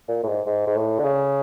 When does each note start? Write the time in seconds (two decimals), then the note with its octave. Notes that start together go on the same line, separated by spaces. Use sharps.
0.09 A#2
0.23 A2
0.28 G#2
0.47 G#2
0.67 G#2
0.76 A2
0.99 D3
1.04 C#3